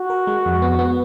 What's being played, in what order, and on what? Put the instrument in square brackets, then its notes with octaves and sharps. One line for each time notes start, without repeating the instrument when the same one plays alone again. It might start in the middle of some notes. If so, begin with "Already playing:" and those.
Already playing: [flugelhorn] F#4
[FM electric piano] A#4
G#3
F2
B3
B3